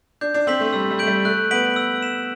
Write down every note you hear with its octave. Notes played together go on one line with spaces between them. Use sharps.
D4 G6
D4
C4 B6 F#7
A3
G3 E6
G3
A3 G6 D7 F#7
G3
A3 F#6
B3 B6 D7 F#7
E6
B6 E7